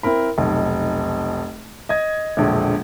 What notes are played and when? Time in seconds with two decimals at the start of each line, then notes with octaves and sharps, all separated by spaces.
0.03 C4 E4 A#4 B5
0.38 F1 B1
1.89 D#5 G#6
2.37 E1 A#1 D3